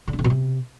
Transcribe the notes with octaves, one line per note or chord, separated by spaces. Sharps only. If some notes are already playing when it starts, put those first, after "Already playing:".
D3
D4
D3
B2
C3